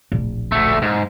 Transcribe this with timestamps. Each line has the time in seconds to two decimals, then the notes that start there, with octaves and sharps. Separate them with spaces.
0.12 D1 A#1
0.52 D2 A3
0.82 G#2